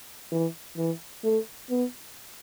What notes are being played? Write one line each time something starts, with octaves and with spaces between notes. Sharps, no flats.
E3
E3
A3
B3